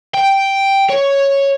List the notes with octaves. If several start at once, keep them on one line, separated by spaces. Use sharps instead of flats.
G5
C#5